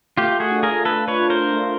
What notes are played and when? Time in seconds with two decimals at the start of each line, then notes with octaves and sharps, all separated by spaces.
0.18 A3 F4 G4
0.40 F#4 G#4
0.51 D4 F4
0.63 G#4 A#4
0.85 A3 A4 B4
1.08 B4 C#5
1.19 D4 F4
1.30 A#4 C5
1.53 A3